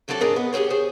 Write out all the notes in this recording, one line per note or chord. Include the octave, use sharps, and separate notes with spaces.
E2 F#3 C4 G4 A4 D5
G#2 D4 G#4 A#4 D5
B3
G4 G#4 A#4 C5 C#5
G#4 C5